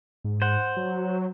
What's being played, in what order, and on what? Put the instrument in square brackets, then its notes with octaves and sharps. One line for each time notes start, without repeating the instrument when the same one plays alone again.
[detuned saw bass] G#2
[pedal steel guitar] C5 F#5
[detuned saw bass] F#3